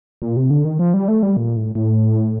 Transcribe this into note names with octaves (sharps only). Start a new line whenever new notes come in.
A#2
C3
D3
D#3
F3
G3
A3
G3
A#2
A2
A2